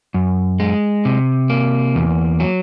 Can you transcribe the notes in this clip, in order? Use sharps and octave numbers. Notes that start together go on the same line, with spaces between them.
F#2
G#3
C3
A#3
E2
F#3